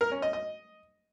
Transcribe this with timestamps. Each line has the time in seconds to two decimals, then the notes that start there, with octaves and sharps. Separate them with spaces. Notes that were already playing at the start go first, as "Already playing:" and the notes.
0.01 A#4
0.12 C#4
0.22 D#5
0.33 D#5